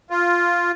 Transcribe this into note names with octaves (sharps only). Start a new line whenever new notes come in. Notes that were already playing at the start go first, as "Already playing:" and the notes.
F4